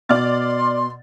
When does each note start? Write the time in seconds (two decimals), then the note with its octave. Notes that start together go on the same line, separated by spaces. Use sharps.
0.09 B2 D5 C6 F6 A6